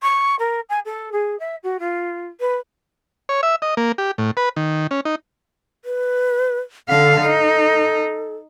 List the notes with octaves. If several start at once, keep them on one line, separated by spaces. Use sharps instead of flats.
C#6
A#4
G#5
A4
G#4
E5
F#4
F4
B4
C#5
E5
D#5
A#3
G4
A2
B4
D#3
C#4
D#4
B4
D3 A4 F5
D#4 A4